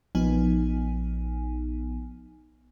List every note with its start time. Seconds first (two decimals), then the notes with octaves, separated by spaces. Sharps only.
0.15 A#1 F3 B3 D#4 G#5